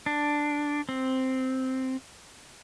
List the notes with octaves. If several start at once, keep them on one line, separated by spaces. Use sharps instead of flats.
D4
C4